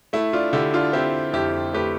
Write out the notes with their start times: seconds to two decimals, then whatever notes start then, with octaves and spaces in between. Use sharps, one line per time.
0.13 A3 E4
0.33 D4 F4
0.53 D3 E4 G4
0.73 D4 F4
0.93 C4 E4 G4
1.33 F2 E4 G4
1.73 A3 G4 B4